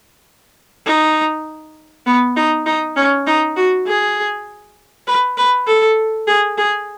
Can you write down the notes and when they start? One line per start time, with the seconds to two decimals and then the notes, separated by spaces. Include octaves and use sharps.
0.87 D#4
2.06 B3
2.36 D#4
2.66 D#4
2.96 C#4
3.27 D#4
3.56 F#4
3.87 G#4
5.07 B4
5.37 B4
5.67 A4
6.27 G#4
6.58 G#4